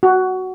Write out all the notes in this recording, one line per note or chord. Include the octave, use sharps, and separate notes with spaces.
F#4